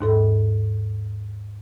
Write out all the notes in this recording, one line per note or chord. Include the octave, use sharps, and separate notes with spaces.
D#2 G#2 A4